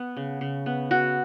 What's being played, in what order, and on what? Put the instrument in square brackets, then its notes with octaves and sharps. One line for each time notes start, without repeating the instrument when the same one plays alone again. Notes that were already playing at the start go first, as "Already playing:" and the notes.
Already playing: [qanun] B3
C#3
C#3
B3
B3 F#4